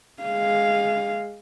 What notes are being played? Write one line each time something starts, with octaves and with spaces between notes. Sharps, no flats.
G#3 F5